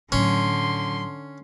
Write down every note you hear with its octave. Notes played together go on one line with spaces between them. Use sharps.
A2 D3 F#3 C#4 C6